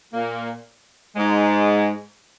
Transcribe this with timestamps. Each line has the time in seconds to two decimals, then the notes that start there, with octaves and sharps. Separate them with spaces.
0.13 A#2 A#3
1.16 G#2 G#3